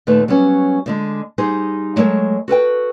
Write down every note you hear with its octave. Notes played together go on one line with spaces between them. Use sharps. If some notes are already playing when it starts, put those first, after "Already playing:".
D#2 A#2 D#3 A3 B4
F#3 G3 B3 C#4
A2 D3 G#3
G3 D#4 G#4 C5
F#3 G#3 A3 A#4 C#5
F#4 A4 B4 G5